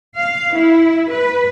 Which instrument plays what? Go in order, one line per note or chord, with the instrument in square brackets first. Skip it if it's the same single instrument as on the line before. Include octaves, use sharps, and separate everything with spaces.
[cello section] F5
E4
B4